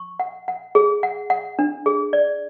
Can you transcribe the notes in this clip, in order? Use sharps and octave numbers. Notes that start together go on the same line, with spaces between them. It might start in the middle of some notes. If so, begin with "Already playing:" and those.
Already playing: C#6
F#5
F#5
G#4
F#5
F#5
D4
G#4
D5